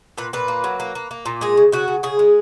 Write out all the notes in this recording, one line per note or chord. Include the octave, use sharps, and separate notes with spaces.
A#2 B4
A#2 B4
A#3
F#3
A#3
A#3
A#3
A#2
G#3 G#4
C#3
C#3 F#4
C#3
C#3 G#4
G#3